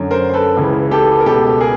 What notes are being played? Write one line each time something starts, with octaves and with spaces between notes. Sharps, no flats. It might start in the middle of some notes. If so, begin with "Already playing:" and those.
Already playing: F#2 D3
A#4 C5
C5
A4 B4
C#2 C#3 E3
G4 A4
A#4
C#2 B2 G4 A4
G#4 A#4